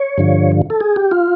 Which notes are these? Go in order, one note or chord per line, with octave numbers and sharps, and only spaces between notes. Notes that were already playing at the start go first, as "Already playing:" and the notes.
Already playing: C#5
G2 D3 F3
A4
G#4
G4
F4